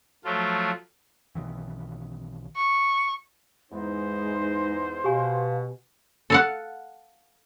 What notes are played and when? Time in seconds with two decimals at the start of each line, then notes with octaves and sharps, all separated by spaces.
0.24 F3 F#3 A3 F4
1.35 B1 D#3 E3
2.56 C#6
3.72 E2 G#2 G#3 D#4 C5
5.04 B2 G4 F5 G#5
6.30 A4 F5 F#5